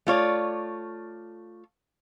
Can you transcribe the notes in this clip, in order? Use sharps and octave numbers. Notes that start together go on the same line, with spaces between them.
A3 F4 C#5 D5